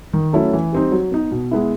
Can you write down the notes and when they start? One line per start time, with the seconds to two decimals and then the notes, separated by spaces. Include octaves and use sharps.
0.13 D#3
0.33 F#3 A3 C#4 E4
0.53 E3
0.73 G3 C4 D#4
0.92 F#3
1.11 B3 D#4
1.31 B2
1.51 G#3 B3 E4